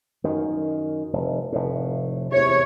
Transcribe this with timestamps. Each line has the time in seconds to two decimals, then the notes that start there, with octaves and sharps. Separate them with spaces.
0.24 F#2 D#3
1.13 F1
1.52 F1 A2
2.32 E2 C3 C#5